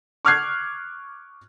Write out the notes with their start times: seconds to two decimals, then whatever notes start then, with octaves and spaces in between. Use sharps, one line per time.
0.25 C#6 D6 F6 F#6 G#6 C7